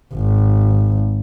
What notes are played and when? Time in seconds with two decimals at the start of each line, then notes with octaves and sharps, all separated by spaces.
0.15 G#1